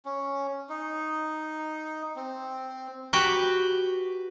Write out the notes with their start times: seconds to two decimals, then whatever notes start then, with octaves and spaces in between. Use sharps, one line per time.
0.05 C#4
0.69 D#4
2.16 C4
3.13 F#4 G4 B4 G5